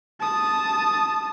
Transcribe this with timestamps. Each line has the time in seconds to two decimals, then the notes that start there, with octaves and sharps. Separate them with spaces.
0.20 A5 D#6